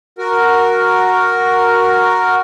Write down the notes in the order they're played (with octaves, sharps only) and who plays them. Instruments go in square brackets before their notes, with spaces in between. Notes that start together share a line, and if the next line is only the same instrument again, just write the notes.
[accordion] F#4 A#4